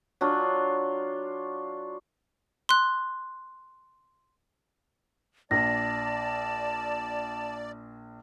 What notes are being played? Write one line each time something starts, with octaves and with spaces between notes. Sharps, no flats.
F#3 D4 F4
C6 F#6
A#1 D5 A5 A#6